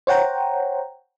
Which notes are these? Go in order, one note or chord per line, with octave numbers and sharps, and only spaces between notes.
C5 C#5 F#5 G5 A#5